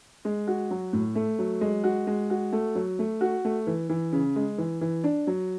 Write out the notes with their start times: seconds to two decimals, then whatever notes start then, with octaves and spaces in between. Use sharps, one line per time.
0.25 G#3
0.47 F#4
0.71 F#3
0.93 A2
1.15 A3
1.39 F#3
1.61 G#3
1.84 F#4
2.07 G#3
2.30 F#4
2.52 A3
2.75 F#3
2.99 A3
3.21 F#4
3.45 A3
3.67 E3
3.89 E3
4.12 C#3
4.36 G#3
4.58 E3
4.81 E3
5.04 D4
5.27 F#3